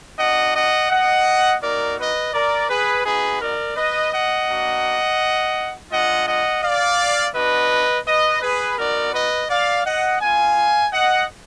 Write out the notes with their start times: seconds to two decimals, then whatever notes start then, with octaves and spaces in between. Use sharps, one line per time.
0.19 B3 D4 F#4 D#5 F#5
0.55 D#5 F#5
0.90 D#5 F#5
1.62 A#3 D#4 F#4 A#4 D5
1.99 B4 D#5
2.34 A#4 D5
2.69 G#4 B4
3.05 B3 D#4 F#4 G#4 B4
3.41 A#4 D5
3.77 B4 D#5
4.13 D#5 F#5
4.49 A#3 D4 F#4
5.92 G#3 D4 F4 D#5 F#5
6.28 D#5 F#5
6.63 D5 F5
7.35 B3 D4 F#4 B4 D#5
8.07 B4 D#5
8.42 G#4 B4
8.78 B3 D#4 F#4 A#4 D5
9.14 B4 D#5
9.49 D5 F5
9.85 D#5 F#5
10.21 B3 F4 F5 G#5
10.93 D#5 F#5